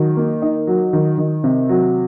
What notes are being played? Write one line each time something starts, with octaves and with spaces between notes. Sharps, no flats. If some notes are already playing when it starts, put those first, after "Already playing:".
Already playing: D#3 F#3
A#3
D#4
F#3
D#3
D#3
C3
F#3